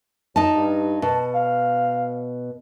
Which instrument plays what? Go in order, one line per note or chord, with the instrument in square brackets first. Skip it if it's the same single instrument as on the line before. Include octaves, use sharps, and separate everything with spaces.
[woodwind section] F3 F#3 [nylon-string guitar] D#4 A5
[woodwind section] G2
[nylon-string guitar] B2 [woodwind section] A5
[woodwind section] F5